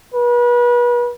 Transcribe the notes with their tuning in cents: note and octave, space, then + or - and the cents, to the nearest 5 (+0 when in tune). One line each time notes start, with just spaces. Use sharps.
B4 -35